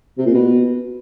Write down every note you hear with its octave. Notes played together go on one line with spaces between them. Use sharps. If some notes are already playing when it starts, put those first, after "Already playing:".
C3
A#2
B2